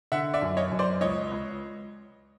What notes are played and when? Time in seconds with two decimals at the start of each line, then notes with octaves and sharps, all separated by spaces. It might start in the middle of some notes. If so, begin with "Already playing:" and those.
0.12 D3 E5 F#5
0.34 D5 E5
0.42 F#2
0.57 C#5 D#5
0.72 F#2
0.79 C5 D5
1.01 C#2 C#5 D#5
1.31 C#2